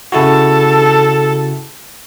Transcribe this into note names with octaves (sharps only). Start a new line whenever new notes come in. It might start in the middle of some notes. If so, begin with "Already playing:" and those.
C#3 E4 F#4 A4